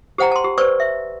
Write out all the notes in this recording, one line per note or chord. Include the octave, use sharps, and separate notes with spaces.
G4 C5 F#5 G5 A#5
A5 C6
G4
B4 C5 D5 C#6 E6
E5